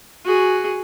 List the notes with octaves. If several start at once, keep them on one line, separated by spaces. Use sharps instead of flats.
F#4 G#4